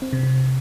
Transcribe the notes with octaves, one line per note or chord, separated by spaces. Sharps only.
C4
C3
C3